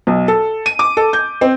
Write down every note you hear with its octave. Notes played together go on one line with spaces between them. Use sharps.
B1
A4
D#7
D6
A4
G6
C4